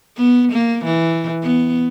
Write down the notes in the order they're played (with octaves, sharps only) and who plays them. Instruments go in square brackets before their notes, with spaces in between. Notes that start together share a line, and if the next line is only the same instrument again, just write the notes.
[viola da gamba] B3
A#3
E3
B3